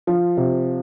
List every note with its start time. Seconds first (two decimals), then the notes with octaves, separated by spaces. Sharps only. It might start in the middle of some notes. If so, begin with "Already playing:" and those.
0.07 F3
0.37 C3